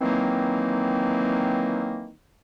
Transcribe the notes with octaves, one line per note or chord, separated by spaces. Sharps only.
D#3 E3 F#3 A#3 C4